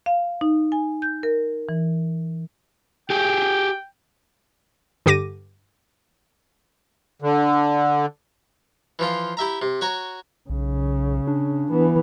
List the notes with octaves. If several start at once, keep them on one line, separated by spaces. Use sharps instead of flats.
F5
D#4
G#5
G6
A#4
E3
G4 G#4 G5
G2 D3 G4 D6 A#6 D#7
D3
E3 F3 F4
E4 G4 E5 A#5
C3
F#4 C#5 A#5
B1 C#3
D4
E3 B3